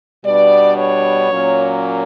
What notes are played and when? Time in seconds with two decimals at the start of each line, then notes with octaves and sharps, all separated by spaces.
0.24 B2 G3 B3 D4 D5
0.78 C#5
1.31 A#2 F#3 A#3 C#4